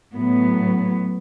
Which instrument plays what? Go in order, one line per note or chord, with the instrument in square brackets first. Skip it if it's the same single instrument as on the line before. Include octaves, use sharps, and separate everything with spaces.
[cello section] A2 F#3 B3